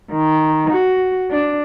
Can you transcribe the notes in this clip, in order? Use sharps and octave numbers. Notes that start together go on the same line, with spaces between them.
D#3
F#4
D4